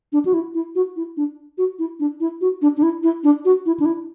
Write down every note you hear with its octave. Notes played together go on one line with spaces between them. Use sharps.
D4
F#4
E4
E4
F#4
E4
D4
F#4
E4
D4
E4
F#4
D4
D4
E4
E4
D4
F#4
E4
D4
E4